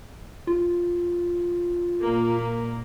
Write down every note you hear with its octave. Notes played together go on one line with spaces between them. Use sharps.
F4
A#2 A#3